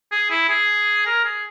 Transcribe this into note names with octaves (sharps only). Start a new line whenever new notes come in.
G#4
E4
G#4
A#4
G#4